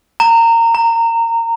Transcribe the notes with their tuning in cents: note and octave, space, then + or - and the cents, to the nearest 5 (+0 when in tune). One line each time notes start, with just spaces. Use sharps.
A#5 -20
A#5 -10